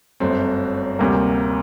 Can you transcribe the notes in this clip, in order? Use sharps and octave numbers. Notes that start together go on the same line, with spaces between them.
G1 F#2 F#3 A3 C4
D2 C3 G3 A#3